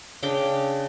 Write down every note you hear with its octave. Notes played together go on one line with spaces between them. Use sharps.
C#3 D4 G5 D6